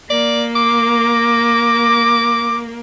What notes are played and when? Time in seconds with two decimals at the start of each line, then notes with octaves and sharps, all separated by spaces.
0.10 A#3 D5
0.56 D6